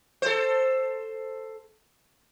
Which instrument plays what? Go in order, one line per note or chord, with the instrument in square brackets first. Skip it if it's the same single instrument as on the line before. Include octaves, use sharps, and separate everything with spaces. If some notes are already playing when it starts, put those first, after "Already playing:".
[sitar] A4 C5